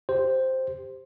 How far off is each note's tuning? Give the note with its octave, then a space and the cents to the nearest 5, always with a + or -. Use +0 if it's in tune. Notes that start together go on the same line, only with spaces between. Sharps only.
G4 +0 C5 +0